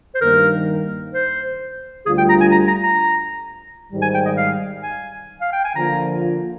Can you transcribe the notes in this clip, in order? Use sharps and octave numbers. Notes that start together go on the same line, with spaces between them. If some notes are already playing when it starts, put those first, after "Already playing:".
C5
G2 D#3 A#3 A#4
C5
D2 D3 G3 D4 F4 G#4
G5
A#5
G#5
A#5
A#5
A#5
G#2 D#3 G3
G#5
G5
D#5
F5
G#5
F5
G5
G#5
D3 F3 A#3 F4 A#5